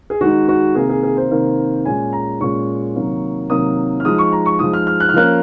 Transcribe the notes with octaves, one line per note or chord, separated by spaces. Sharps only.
G#4
D#3 G#3 D#4 F#4
F#4
C3 D#3 A#3 G#4
G#4
G#4
C5
C3 D#3 A#3
A#2 G#3 C#4 G#5
A#5
A#2 G#3 C#4 C#6
C3 D#3 F#3 A#3
C3 D#3 F#3 A#3 D#6
F6
F3 G#3 D#4 D#6
C#6
A#5
C#6
F3 G#3 D#4 D#6
F6
F6
F#6
F6
F3 A#3 C#4 F#6